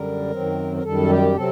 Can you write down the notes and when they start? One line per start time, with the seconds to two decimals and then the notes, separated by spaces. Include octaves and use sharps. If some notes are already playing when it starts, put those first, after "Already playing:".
Already playing: F#2 D3 G3 A#4
0.30 F#2 D#3 F#3 C4
0.76 A#4
0.83 F#2 D#3 G3 A4
1.10 G4
1.35 C3 F#3 C4 A4